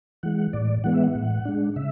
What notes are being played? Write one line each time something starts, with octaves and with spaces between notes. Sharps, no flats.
E3 G#3 F#5
A2 D5
E3 G#3 B3 F#5
E5
F#5
A2
G#3 D4
C#3 E5